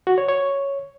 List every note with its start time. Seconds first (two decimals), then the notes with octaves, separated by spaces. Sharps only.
0.07 F#4
0.18 C#5
0.29 C#5